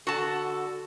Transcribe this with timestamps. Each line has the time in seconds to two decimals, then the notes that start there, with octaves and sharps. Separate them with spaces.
0.07 D3 F#4 A4 A5